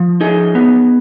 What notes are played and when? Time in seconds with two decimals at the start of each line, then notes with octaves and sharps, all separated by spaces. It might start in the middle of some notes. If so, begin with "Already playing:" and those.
Already playing: F3
0.21 D#4 G#4
0.55 B3